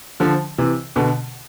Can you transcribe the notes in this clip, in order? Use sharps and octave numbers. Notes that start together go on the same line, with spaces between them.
D3 F3
C3 E3
B2 D3